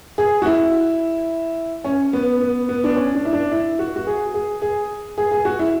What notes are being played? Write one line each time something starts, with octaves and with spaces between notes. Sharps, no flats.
G#4
F#4
E4
C#4
B3
B3
B3
D4
C#4
D4
E4
D4
E4
F#4
F#4
G#4
G#4
G#4
G#4
G#4
F#4
E4